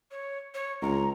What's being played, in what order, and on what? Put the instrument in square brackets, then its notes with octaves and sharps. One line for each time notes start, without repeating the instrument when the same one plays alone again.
[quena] C#5
C#5
[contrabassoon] C#2 [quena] A#5